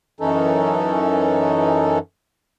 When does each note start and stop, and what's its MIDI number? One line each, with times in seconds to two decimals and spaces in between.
0.20 1.98 42
0.20 1.98 52
0.20 1.98 61
0.20 1.98 63
0.20 1.98 69